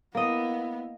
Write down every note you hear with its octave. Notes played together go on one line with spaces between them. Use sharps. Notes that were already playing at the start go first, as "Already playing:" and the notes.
A#3 B3 E4 D#5